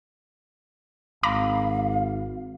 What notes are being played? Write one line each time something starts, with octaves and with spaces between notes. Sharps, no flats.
G#1 F5 A#5 B5 D6